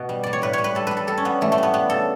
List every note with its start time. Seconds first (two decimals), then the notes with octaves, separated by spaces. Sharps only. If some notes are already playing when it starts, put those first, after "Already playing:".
Already playing: B2
0.09 G3
0.23 G3 D5
0.33 C#5
0.42 A2 B4
0.53 G3 C#5
0.64 B4
0.75 G3 A4
0.87 G3 B4
0.97 A4
1.07 G3 A4
1.18 C#4
1.25 G3 B3
1.41 E3 A3
1.52 A3
1.58 G3 B3
1.74 G3 B3
1.90 C#3 A4